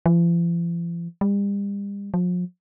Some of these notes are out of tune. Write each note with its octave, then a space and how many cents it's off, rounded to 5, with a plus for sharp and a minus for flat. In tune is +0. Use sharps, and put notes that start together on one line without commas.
F3 -45
G3 +40
F3 +40